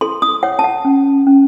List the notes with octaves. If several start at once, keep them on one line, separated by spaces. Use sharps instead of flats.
A4 C6
D#6
C#5 F#5
A5
F#5
C#4
C#4